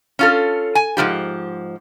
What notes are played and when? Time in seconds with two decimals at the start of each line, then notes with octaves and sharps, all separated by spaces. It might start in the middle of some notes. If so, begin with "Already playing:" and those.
0.19 C#4 F4 A4
0.75 G#5
0.97 G#2 E3 F3 G4